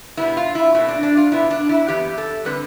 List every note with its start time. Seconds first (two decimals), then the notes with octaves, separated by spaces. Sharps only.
0.17 B2 G3 B3 E4
0.37 F4
0.55 E4
0.75 B2 A3 C4 E4
0.88 D4
1.03 D4
1.17 F4
1.32 B2 B3 E4
1.51 D4
1.69 E4
1.88 F2 E3 B3 G4
2.18 A4
2.45 D3 G3 C4 B4